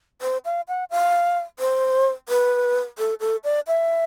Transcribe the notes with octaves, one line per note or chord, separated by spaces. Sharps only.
C5
F5
F#5
F5
C5
B4
A4
A4
D5
E5